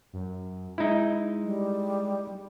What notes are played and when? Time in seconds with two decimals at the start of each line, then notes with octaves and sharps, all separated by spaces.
0.13 F#2
0.78 G#3 D#4 E4
1.44 G3